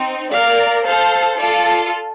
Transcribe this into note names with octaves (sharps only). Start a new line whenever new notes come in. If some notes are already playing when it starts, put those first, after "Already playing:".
Already playing: C4 D#4
A#4 D5 F5
A4 C5 F5
F4 A4 D5